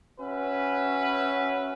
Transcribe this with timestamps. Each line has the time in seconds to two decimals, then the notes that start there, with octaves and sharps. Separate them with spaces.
0.20 C#4 F#4 B4 E5